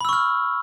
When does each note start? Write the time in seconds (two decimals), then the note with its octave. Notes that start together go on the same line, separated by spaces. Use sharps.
0.01 B5
0.05 E6
0.09 C#6
0.13 F6